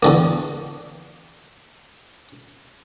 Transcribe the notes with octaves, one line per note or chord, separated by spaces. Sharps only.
E2 D3 A#3